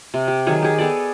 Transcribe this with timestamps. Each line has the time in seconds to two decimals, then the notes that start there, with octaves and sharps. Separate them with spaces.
0.14 C3
0.28 G4
0.47 D#3 F#3 G#4 C#6
0.62 G4 G#4
0.78 B3 G#4 A4 D5